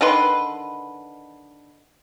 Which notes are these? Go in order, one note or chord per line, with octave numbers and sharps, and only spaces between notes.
D3 D#3 B4 C6